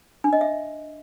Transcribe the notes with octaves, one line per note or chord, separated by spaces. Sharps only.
D4
D#5
E5